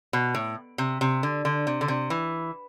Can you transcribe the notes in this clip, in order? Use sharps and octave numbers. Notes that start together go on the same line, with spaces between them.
B2
A2
C3
C3
D3
D3
C3
D3
C3
E3